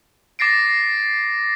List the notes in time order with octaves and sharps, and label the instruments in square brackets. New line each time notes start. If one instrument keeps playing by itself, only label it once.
[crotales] D6 A6 A#6 C7 D7